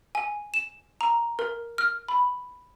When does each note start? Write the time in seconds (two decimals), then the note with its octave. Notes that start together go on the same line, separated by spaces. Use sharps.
0.15 G#5
0.54 E7
1.01 A#5
1.39 A#4
1.78 F6
2.09 B5